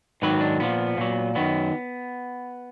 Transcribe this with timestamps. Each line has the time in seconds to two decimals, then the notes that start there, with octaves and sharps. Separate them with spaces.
0.22 G#2 D#3 F#3 B4
0.41 D4
0.60 A#2 F3 B3
0.97 A#2 F#3
1.35 F#2 D#3 F#3 B3